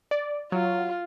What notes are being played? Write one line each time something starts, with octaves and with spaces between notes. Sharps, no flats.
D5
F#3 F4